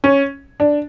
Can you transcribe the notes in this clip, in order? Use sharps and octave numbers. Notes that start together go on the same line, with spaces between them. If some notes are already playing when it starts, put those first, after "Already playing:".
C#4
D4